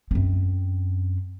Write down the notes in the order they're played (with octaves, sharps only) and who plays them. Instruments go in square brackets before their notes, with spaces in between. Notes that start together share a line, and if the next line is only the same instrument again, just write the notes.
[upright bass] F#2 C4